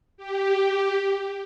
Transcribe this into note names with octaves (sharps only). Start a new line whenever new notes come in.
G4